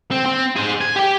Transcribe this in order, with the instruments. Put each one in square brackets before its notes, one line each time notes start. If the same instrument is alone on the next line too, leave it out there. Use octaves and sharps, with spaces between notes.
[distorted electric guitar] C4
C4
G#4 C5
G#5
G4 G5